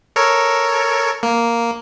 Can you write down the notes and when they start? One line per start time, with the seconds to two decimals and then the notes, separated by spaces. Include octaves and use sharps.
0.16 A4 A#4 C#5
1.23 A#3